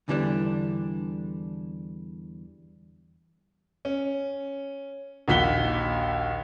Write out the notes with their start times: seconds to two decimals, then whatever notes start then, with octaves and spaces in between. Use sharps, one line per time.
0.08 E2 D3 E3 G3 C4 D4
3.85 C#4
5.28 A#1 D#2 F#4 B6 G7